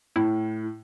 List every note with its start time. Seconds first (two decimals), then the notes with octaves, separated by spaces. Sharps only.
0.16 A2 E4